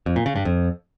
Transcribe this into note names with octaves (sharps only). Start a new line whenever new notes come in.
F2
A#2
C#3
G2
F2